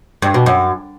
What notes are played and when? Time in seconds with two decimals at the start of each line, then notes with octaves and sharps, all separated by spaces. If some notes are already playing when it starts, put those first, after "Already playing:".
0.22 G2
0.34 B2
0.46 F#2